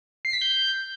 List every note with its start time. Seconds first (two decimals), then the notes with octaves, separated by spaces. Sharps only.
0.25 C7
0.33 B6
0.41 G6